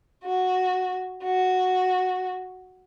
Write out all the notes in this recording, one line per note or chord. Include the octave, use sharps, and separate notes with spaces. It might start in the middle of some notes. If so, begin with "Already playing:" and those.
F#4
F#4